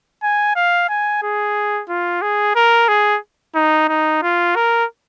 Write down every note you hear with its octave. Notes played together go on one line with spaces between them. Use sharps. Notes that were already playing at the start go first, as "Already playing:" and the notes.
G#5
F5
G#5
G#4
F4
G#4
A#4
G#4
D#4
D#4
F4
A#4